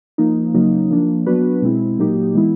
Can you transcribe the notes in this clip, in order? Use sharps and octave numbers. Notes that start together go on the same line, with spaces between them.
F3 A#3 D#4
C#3 F#3 A#3 D#4
F3 A#3 D4
F#3 B3 D4 F#4 B4
B2 G#3 C4 E4
A#2 F#3 A#3 D#4 G4
E3 G#3 B3 E4